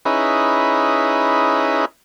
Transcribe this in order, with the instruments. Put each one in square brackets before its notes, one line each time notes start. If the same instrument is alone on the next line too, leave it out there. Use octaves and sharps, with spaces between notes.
[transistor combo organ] C#4 D#4 E4 G#4 B4